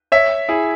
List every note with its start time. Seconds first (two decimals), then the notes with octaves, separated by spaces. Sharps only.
0.12 C#5 E5
0.49 E4 G#4